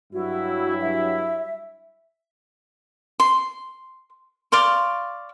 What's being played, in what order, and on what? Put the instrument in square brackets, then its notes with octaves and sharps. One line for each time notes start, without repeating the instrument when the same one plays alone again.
[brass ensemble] G2 F#3 E4 [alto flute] F#4
[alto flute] E5
[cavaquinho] C6
D5 F5 C6 C#6